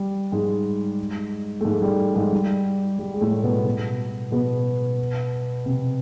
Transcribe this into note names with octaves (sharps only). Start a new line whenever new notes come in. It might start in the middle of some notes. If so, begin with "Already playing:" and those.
Already playing: G3
G#2 G#3
A3
G#2 G#3
G3
G#2 G#3
G3
G3
G#3
A2 A3
B2 B3
B2 B3
B2 B3
C3 C4